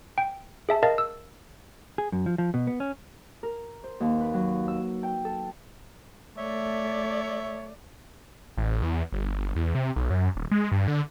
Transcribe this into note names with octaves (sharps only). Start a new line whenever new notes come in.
G5
G#4 E5 A5
A#4 D#5 F5 A5 A6
E6
G#4
F#2
F3
F3
B2
B3
C#4
A#4
C5
D#2
B4
F#3
E6
G5
A4
A3 C#5 D5 E5
A1
E2
G1
E2
C3
B1
F#2
D#1
G#3
G2
D3